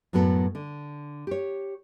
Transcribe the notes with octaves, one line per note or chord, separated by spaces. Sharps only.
F#2 A2 F#3 B3 A4
D3
G4 C#5